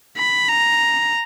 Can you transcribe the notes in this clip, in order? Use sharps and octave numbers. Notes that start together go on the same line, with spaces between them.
B5
A#5